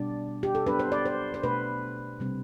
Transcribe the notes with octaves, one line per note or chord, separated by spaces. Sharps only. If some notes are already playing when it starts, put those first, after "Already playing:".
Already playing: B2 G3 D4 D5
G4
A4
F#3 B3 D4 B4
C5
D5
C5
C5
B2 A3 D4 B4
C3 G3 C4